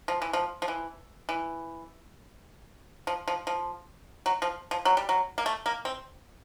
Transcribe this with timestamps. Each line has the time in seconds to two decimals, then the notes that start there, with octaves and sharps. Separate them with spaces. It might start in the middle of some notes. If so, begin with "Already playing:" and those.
0.08 F3
0.22 E3
0.33 F3
0.62 F3
0.68 E3
1.29 E3
3.07 F3
3.28 F3
3.47 F3
4.26 F#3
4.42 F3
4.71 F3
4.85 F#3
4.97 G3
5.09 F#3
5.38 A#3
5.46 A3
5.66 A#3
5.85 C4